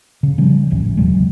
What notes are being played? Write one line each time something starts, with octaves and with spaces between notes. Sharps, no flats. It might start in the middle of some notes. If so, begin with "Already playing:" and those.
C#3
C#3 F3 G3
D1 A1 E3
E2 C3 F#3 G#3